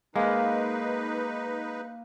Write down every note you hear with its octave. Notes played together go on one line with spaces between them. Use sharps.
G#3 A#3 D#4 B4